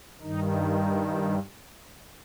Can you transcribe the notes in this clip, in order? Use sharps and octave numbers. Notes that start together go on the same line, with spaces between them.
G2 D#3 D#4
D#4
E4